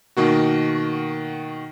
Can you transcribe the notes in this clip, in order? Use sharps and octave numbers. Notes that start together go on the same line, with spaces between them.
B2 D#3 A#3 F#4